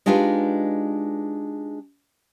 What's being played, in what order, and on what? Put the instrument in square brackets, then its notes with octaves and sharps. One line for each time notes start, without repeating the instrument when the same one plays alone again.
[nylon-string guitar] G#3 D4 D#4 F4 G4 B4